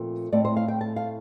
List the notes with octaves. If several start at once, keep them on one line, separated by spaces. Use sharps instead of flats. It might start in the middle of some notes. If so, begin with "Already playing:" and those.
Already playing: A#2 F3 A3 C4
A2 A3 C4 D5
C5
F5
G5
A5
F5